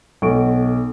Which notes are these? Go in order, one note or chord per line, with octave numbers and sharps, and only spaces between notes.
B1 A4 C#6 D7